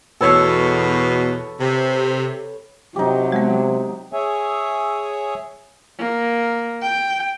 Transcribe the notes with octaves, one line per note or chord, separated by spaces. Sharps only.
E2 B2 A4 B4 C#5
C3
C3 F#3 D#4 G4
G#3 B3
G#4 C#5 E5 G#5
A#3
G5